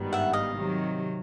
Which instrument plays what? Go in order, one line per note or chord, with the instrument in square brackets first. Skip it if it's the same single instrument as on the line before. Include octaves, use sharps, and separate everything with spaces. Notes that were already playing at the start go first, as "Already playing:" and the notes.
Already playing: [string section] G#1 G2 D#3 G3 B3
[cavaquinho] E5 F#5
D#5 F5
[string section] C3 D#3 F#3